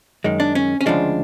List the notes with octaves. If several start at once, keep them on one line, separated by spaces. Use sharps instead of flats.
F#2 D#3 G#3
D4
C#4
C#4
D2 C#3 F3 G#3 D4